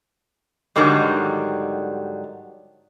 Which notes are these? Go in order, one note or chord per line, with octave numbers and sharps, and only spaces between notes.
G#2 D3 D#3 F#3 G3